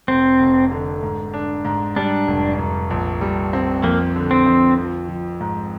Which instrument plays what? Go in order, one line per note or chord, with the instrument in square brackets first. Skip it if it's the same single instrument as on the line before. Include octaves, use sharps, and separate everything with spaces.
[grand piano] F1 [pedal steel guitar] C4
[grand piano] F1
D3
G#2
D4
G#2
[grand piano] G3 [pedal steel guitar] D4
[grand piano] F1
F1
A#1
G3
C4
[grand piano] F2 [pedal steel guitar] A#3
[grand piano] D3
[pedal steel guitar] C4
[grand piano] F2
F3
F3
G#2